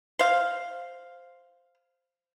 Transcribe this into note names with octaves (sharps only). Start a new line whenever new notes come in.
C5 F5